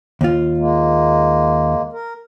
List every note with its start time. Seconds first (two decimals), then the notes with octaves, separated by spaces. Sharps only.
0.21 D#2 F4
0.57 G#3 A#3
1.92 A#4